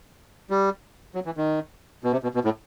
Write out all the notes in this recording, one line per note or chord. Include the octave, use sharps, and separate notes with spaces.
G3
F#3
E3
D#3
B2
C3
B2
B2
A2